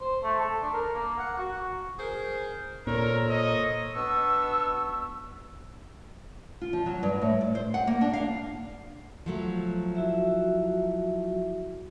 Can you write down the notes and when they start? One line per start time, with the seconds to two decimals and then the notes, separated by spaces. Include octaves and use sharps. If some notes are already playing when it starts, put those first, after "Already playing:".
0.01 C5
0.23 A3
0.40 A4
0.62 D4
0.74 A#4
0.95 A#3
1.19 F#5
1.38 F#4
1.99 G#4 A#4 C5
2.87 A#2 A4 A#4 C5 C#5
3.29 D#5
3.94 B2 B3 D4 C#6 E6
6.61 F4
6.73 F3
6.86 F#3
7.03 G2
7.21 A2
7.41 D5
7.55 C5
7.74 F#5
7.87 A#3
8.01 D4
8.13 F5
9.26 F3 F#3 A3
9.95 E4 F#4 E5